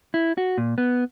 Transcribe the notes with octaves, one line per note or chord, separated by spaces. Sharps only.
E4
F#4
A#2
B3